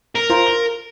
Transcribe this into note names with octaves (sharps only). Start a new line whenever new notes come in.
A#4
F4 C5 A#5
G7